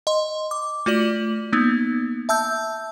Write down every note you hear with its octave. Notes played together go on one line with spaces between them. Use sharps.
D#5 C6
D6
A3 F4 F#4 D5 F#7
A#3 B3 D#4
E5 A5 E6 G6